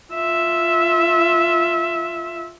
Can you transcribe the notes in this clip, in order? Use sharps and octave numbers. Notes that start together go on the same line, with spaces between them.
F4 E5